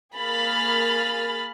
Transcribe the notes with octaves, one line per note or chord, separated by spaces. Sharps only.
A#3 G#4 B5 F6 A6